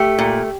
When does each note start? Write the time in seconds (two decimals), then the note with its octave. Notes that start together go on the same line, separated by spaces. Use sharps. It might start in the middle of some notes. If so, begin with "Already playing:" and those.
Already playing: A3 G4
0.19 A#2